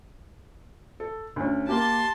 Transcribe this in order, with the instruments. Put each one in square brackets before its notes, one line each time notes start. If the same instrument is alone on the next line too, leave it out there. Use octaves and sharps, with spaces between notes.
[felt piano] A4
D2 C#4
[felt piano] A#3 G4 [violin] A5 C6